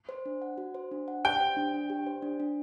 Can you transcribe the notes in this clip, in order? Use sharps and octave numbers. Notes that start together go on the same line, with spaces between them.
C5
D4
F#5
F#4
C5
D4
F#5
G4 G5
C5
D4
D4
G4
C5
D4
D4